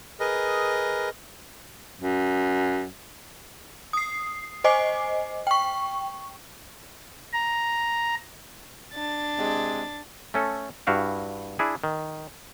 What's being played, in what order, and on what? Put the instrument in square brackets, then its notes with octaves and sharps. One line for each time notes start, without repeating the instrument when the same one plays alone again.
[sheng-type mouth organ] G#4 A#4 B4 D#5
[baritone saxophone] F#2
[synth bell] D#6 C7
C5 D#5 G#5 D6 C7
G5 C#6
[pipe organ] A#5
[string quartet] D4 A6
[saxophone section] C3 G#3
[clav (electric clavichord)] A3 C#4 A4
G2 E4 F#4 F5 G5
D4 E4 G#4
D#3